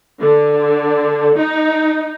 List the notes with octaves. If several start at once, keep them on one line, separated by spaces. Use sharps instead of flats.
D3
D#4